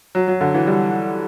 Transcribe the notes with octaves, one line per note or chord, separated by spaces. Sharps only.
F#3
F#3
D3
E3
G3